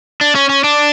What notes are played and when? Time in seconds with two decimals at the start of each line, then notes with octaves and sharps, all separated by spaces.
0.21 D4
0.35 C#4
0.49 C#4
0.64 D4